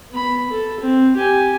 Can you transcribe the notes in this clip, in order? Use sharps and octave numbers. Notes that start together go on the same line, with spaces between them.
B3 B5
A4
C4
G4 G#5